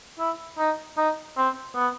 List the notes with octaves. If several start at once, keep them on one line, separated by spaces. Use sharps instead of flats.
E4
D#4
D#4
C4
B3